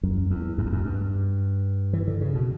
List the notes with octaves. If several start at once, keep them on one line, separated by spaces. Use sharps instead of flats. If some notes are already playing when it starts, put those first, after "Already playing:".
F#2
E2
F#2
E2
F#2
G2
E3
D3
C#3
B2